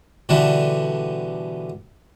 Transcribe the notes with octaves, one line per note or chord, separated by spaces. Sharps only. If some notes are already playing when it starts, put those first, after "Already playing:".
B2 D3 E3 G3